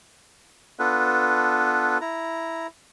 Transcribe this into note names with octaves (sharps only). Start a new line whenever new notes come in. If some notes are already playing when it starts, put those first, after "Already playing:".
B3 D4 F4 A4 B4
E4 A#5